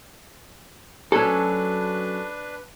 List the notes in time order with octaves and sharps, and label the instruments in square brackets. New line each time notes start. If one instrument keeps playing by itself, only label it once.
[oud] F#3 C#4 [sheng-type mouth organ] D4 B4 [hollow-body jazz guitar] A4